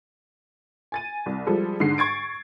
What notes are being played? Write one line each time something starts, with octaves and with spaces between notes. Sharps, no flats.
G#5 A6 D#7
C2
F3 G3 G#3 A4
G#2 D3 C7
C#6 G#6 A6 D7